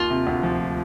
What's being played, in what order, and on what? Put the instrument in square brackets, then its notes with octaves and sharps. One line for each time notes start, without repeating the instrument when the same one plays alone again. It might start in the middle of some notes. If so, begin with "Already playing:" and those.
Already playing: [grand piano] D#2 [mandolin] F4
[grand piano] C3
D2
F3